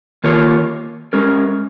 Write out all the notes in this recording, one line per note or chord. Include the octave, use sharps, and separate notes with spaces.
D#3 A#3 F4 A#4 C#5
G#3 C#4 A#4